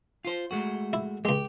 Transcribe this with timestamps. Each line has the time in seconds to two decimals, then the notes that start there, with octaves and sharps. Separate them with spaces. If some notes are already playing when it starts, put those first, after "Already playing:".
0.25 F4 C5
0.51 G#3 A3 F#4
0.93 E4
1.25 C#2 G#3 G4